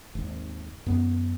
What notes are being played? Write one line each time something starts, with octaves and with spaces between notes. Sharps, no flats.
G#1 D#2
F#2 B3